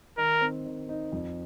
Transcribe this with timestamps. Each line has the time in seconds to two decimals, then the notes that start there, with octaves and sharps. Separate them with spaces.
0.18 D#3 A#4
0.41 C4 D#4
0.66 D#3
0.88 C4 D#4
1.12 F2